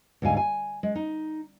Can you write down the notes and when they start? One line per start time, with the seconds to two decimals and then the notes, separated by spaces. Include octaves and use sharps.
0.22 D2 G#2 G3 F5 G#5
0.37 G#5
0.83 G#3
0.95 D#4